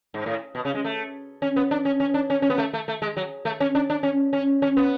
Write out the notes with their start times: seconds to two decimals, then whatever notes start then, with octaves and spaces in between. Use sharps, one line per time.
0.14 G#2
0.26 A2
0.55 B2
0.65 C#3
0.75 G#3
0.84 A3
1.42 C#4
1.56 B3
1.71 D4
1.85 C#4
2.00 C#4
2.14 D4
2.30 C#4
2.42 C#4
2.50 B3
2.58 A3
2.73 A3
2.88 A3
3.02 G#3
3.17 F#3
3.45 A3
3.60 C#4
3.75 D4
3.90 D4
4.03 C#4
4.33 C#4
4.62 C#4
4.77 B3